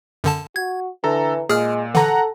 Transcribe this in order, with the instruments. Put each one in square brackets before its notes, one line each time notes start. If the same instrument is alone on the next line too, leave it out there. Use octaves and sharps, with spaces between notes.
[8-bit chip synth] F#2 D3 A5
[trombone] F#4 [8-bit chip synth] G#6
[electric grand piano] D3 A4 A#5 [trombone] E3
[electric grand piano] A#2 [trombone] G#3 [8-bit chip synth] G#4 F6
[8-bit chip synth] D3 E3 [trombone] A4 [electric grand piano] F#5 A#5